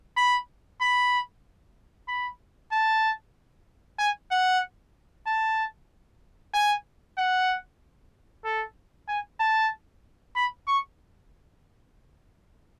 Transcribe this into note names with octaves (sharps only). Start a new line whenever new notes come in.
B5
B5
B5
A5
G#5
F#5
A5
G#5
F#5
A4
G#5
A5
B5
C#6